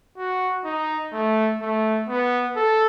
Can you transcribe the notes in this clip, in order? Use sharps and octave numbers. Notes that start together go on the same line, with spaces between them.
F#4
D#4
A3
A3
B3
A4